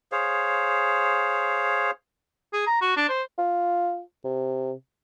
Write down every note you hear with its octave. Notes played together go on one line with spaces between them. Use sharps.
G#4 C5 C#5 F5
G#4
A#5
F#4
D4
C5
F4
C3